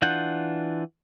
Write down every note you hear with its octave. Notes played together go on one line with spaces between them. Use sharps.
E3 D4 F4 F#5 G6